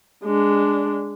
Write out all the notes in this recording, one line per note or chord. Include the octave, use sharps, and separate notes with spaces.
G#3 D4